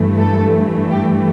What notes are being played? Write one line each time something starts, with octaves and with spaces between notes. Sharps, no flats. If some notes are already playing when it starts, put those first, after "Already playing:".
Already playing: G2 E3 A3
A4
G4